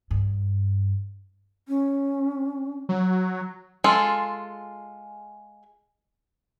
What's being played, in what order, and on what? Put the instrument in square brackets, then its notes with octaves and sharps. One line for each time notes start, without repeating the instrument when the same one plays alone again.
[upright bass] G2
[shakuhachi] C#4
[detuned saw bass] F#3
[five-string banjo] G#3 F4 G#4 A4